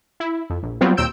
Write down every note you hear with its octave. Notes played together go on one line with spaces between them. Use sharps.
E4
F2
A#1
F#3 G3 B3 C4 F4
D#2 A#2 C4 E6 G6 D7